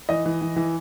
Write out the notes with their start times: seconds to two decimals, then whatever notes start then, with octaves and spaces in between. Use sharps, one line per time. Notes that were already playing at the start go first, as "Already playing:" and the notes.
0.09 E3 D#5
0.26 E3
0.41 E3
0.56 E3